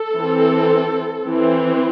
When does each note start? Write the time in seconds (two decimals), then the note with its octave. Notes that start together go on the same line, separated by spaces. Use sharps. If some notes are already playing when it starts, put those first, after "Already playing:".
Already playing: A4
0.15 E3 C4
1.26 E3 C4